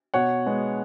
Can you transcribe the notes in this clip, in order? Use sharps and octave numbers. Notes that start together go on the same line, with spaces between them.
B2 C#5 F#5
G#3 B3